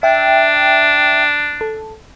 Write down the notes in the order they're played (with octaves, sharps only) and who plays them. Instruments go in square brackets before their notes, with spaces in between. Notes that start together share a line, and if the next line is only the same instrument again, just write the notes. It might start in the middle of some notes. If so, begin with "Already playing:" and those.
[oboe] D4 [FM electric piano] E5 G5
[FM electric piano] A4